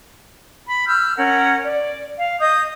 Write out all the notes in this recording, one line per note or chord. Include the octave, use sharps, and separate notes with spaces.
B5
E6 F6 G6
C#4 A#4 F#5
D5
F5
D#5 D#6 G6